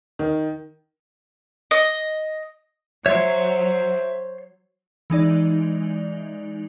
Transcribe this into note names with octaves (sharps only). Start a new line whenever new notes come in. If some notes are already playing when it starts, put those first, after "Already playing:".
D#3
D#5
F#3 C5 C#5 E5 C6
E3 G#3 D#4 D5